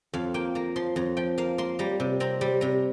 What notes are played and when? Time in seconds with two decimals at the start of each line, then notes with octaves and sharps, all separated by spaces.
0.13 F2 F5
0.34 A#3 G5
0.55 A#3 A#5
0.76 F3 C6
0.96 F2 A#5
1.17 F3 G5
1.38 A#3 F5
1.58 A#3 C6
1.79 G3 A#5
2.00 C3
2.20 C4 A#5
2.41 G3
2.61 C3 A#5